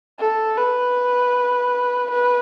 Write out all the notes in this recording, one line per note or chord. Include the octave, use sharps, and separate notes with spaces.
A4
B4
B4